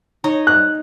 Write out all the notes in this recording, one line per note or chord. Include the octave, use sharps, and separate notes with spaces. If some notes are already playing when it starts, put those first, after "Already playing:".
D#4 C#5 D#5
F#6